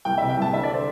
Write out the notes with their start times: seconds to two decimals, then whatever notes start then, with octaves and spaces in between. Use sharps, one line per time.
0.05 C2 G5
0.18 C3 E5
0.30 G5
0.37 C2 A5
0.53 D3 E5
0.63 D5
0.70 D3 C5